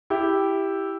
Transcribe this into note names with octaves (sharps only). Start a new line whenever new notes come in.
E4 G4